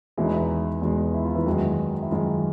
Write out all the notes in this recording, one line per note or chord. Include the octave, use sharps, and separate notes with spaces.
E2 B2 G#3 E4
D#4
E3 E4
E2 B2 G#3
E4
F4
E3 E4
F#2 D#3 F#3 G#3 F#4
E4
F#2 D#3 F3 G#3 F4